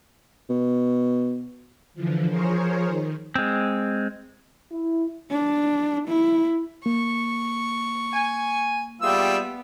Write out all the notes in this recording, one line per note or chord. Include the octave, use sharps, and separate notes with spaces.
B2
D3 E3 F3
F3 G#4 A#4 C5 C#5
D#3
G#3 C4
E4
D4
E4
A#3 C#6
G#5
G3 B3 F4 G#4 E5 G5 E6